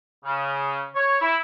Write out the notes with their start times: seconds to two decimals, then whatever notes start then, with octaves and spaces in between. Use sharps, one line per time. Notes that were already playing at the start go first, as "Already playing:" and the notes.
0.25 C#3
0.95 C#5
1.21 E4